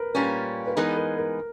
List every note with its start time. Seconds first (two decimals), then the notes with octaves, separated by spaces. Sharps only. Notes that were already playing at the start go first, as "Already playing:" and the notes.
Already playing: A#4 B4
0.14 A#2 G3 A#3 C#4 B4
0.67 B4
0.77 E3 G#3 B3 D#4 G#4 A#4
0.97 A#4
1.18 A#4